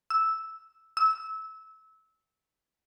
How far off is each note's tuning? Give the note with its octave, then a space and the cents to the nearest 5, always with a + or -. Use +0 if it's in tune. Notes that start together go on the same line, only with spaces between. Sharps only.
E6 -5
E6 -20